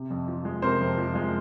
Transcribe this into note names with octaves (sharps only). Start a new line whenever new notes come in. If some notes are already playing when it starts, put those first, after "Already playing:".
Already playing: C3
F2
F3
G#3
C3 A#4 C5
F2
F3
G#3